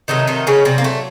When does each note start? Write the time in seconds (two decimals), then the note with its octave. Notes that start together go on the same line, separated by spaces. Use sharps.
0.08 C3 D#3 F#3 A3 D#4
0.28 D#3 D#4
0.47 C#3 C#4
0.65 C3 C4
0.78 A#3
0.84 A3